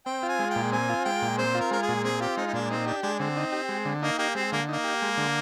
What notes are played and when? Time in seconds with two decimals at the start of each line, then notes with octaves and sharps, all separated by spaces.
0.06 C4 G5
0.23 F4
0.28 G#5
0.39 G#3
0.50 G5
0.56 A#2
0.72 C4 G#5
0.89 F4
1.05 G#3 G5
1.22 A#2
1.38 C4 C5
1.55 F4
1.60 A#4
1.71 G#3 A#4
1.82 G#4
1.88 A#2
2.04 C4 G#4
2.20 F4 G4
2.37 G#3 D#4
2.47 D#4
2.53 A#2 D4
2.70 C4 D#4
2.86 D4 G4
3.03 G#3 D4
3.19 D3 C4
3.37 D#4
3.52 G4
3.69 G#3
3.85 D3
4.02 A#3 D#4
4.18 A#3 G4
4.35 G#3 C4
4.52 D3 A#3
4.68 A#3 D#4
4.84 G4
5.02 G#3
5.17 D3